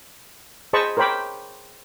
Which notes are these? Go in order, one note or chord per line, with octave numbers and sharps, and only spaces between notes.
G#4 C5 D#5 A5 B5 C#6
A#4 C5 C#5 G5 B5 D6